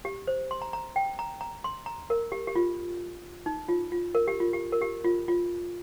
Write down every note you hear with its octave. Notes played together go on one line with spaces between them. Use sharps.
G4
C5
C6
A#5
A#5
G5
A#5
A#5
C6
A#5
A#4
G4
G4
F4
D#4
F4
F4
A#4
G4
F4
G4
A#4
G4
F4
F4